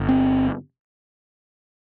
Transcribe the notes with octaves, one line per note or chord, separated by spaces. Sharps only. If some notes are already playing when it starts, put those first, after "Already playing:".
Already playing: G1
C4